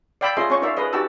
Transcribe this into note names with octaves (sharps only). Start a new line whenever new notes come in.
D5 F5 G5 B5 E6
C#4 F4 G#4 D#5 E5 C6
C#4 F4 C#5 G#5 C#6
D#4 A#4 D5 E5 F5
G#4 A#4 B4 D#5
D#4 F#4 G4 A5 E6